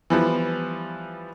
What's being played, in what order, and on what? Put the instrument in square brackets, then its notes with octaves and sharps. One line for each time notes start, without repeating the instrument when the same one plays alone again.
[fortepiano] E3 F3 G3 B3